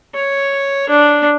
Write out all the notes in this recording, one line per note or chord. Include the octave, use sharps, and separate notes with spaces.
C#5
D4